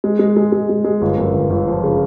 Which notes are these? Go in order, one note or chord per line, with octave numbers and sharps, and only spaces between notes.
G#3
G#3
G#3
G#3
G#3
G#3
G1
F#2
G1
G1
F3
C#3